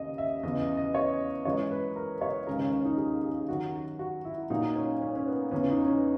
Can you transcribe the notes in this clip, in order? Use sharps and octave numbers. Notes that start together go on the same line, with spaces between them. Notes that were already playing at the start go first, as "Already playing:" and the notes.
Already playing: D#2 C#3 D#5
E5
E2 C#3 E3 D#5
D#5
D#5
C#5
F#2 E3 G#3 C#5
B4
A#4
C#5
D#2 C#3 G#3 A#4
C#4
C#4
D#4
G#4
G#4
F#2 D#3 F#3 F#4
F#4
E4
A#2 F#3 D#4
C#4
C#4
C#4
B3
E2 C#3 E3 C#4
D#4
C#4